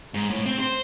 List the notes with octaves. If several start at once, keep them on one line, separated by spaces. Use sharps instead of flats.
G#2
A2
C4
C5